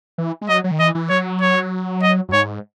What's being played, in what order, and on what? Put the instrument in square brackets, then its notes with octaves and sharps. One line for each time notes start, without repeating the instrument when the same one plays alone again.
[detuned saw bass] E3
G#3
[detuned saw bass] F#3 [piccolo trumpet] D#5
[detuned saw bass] F#3
D#3
[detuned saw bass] E3 [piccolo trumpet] D#5
[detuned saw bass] E3
[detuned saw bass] F#3 [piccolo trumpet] C#5
[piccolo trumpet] C#5
D#5
[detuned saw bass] F#2
[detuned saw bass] G#2 [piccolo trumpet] C#5